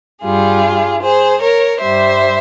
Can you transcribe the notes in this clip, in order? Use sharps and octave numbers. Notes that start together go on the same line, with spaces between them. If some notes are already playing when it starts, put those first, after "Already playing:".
G2 G3 F4 G#4
G#4 C5
A#4 C#5
G2 G3 C5 E5